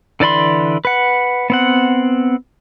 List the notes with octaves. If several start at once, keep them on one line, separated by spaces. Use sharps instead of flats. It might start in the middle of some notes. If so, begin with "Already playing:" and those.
D3 E3 D5 B5 C6
B4 F#5
B3 C4 F#5